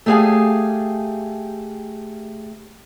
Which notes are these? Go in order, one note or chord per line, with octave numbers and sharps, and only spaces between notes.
A3 G4 G#4 B4 F5 G#5